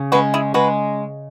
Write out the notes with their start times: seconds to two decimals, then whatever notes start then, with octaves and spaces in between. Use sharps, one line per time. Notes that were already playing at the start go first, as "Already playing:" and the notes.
Already playing: C#3
0.12 G#3 C#4 F#4 B4
0.34 E4 G#4
0.54 G#3 F#4 B4